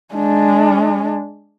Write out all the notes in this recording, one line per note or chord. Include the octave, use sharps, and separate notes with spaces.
G#3 D4